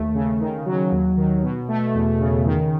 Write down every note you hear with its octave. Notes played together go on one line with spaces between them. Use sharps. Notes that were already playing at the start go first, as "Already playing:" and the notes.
Already playing: D#2 A3
C#3
D#3
F#3
D#2
D#3
B2
A3
E2
C#3
D#3